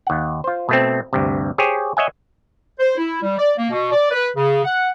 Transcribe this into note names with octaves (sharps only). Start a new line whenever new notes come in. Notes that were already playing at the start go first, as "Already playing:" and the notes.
D#2 F#5
F4 C5
B2 A3 C4
D2 G2 C3
G4 G#4 C5 C#5
C#5 D#5 E5 F#5 G#5
C5
E4
G3
D5
A#3
B2
D5
B4
C#3
F#5